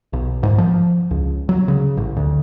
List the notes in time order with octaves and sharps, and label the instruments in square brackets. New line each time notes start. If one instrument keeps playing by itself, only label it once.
[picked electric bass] B1
G#2
F3
C#2
F#3
C#3
A1
D2